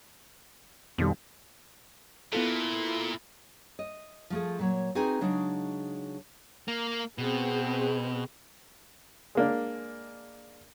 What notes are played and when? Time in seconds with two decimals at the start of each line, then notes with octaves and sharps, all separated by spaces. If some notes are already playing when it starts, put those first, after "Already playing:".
0.98 F2 B2 D#3 G3
2.33 A#2 B3 E4 F4 A4
3.79 D#5
4.30 F3 A3 G#4
4.59 A#2 F#3 C#5
4.95 C4 D#4 F#4 G#4 B4 G#5
5.21 C#3 F#3 G#3 D4 D#4
6.68 A#3
7.18 B2 C4 G#4 B4
9.35 G#3 A#3 D4